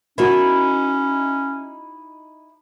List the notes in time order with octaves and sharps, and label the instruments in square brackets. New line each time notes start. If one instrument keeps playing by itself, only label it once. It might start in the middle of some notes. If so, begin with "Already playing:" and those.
[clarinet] C#4 [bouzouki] D#4 E4 [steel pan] F#4 A#4